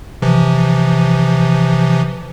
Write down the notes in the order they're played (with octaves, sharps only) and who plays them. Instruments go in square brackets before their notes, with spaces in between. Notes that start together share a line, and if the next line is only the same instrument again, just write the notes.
[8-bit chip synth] C3 E3 F3